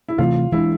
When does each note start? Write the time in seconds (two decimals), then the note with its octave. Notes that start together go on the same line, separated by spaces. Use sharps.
0.08 E4
0.18 C3 E3 A3 C4 F4
0.52 E3 G#3 D4 E4